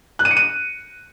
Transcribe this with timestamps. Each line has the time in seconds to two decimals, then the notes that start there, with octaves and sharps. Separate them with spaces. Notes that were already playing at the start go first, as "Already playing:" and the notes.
0.19 F#6
0.25 D#7
0.31 C#7
0.37 D#7